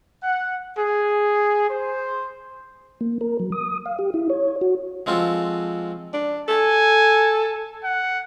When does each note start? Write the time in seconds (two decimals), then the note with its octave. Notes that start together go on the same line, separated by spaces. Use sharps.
0.23 F#5
0.77 G#4
1.70 C5
3.01 A#3
3.21 A#4
3.40 F#3
3.52 D#6
3.86 F5
3.99 G4
4.14 E4
4.30 C#5
4.61 F#4
5.06 F3 G#3 C4 F4 F#4 A4
6.14 D4
6.48 A4 G#5
7.84 F#5